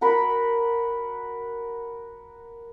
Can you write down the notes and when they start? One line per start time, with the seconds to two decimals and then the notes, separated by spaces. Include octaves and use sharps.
0.01 F#4 A#4 B5